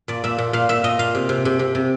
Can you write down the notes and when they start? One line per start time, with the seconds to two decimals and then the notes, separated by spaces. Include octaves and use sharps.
0.08 A#2 D5
0.24 A#2 E5
0.38 A#2
0.53 A#2 F5
0.69 A#2 E5
0.84 A#2 D#5
0.99 A#2 F5
1.15 C3
1.29 C3
1.45 C3
1.59 C3
1.75 C3